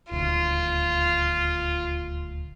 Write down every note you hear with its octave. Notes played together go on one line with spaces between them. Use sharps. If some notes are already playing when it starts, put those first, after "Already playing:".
D#1 D2 F4